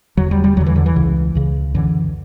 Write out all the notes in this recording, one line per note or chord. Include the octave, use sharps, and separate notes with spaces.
E2 D3 F#3
G3
G3
E2 D3 F#3
E3
D3
E3
C#2 C#3
C#2 C#3
F#2 D3 E3